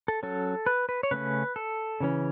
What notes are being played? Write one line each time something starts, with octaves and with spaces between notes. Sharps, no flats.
A4
F#3 C#4 A4
B4
B4
C#5
C#3 A3 C#4 B4
A4
C#3 E3 C#4